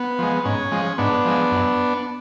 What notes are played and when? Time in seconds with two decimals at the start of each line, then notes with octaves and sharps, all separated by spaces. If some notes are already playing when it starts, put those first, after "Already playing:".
Already playing: B3
0.19 F3 G#3
0.45 G#2 C#4
0.71 F3 G#3
0.98 G#2 B3 D4
1.25 F3 G#3
1.51 F#2